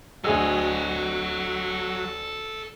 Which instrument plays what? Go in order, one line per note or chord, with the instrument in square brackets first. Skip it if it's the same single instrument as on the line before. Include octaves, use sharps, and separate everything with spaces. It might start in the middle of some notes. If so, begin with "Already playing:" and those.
[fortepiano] D2 G#4 E6 [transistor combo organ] F#3 [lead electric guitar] A4 D#5